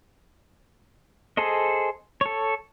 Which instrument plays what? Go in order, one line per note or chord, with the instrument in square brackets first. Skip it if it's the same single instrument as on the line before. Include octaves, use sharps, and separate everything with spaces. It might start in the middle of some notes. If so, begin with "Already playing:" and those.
[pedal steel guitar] G#4 A4 C5 D#5
A4 C#5